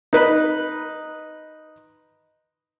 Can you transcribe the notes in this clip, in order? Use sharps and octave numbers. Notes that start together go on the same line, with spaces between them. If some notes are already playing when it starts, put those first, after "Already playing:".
D#4 B4